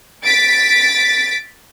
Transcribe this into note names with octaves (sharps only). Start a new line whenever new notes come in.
A6 B6 D7